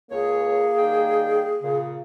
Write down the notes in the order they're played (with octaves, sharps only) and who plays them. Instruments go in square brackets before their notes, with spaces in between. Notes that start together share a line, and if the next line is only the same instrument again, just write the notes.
[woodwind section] C#2 C#5 [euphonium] A#3 [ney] G#4
[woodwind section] D#3 G3 G5
A#2 C#3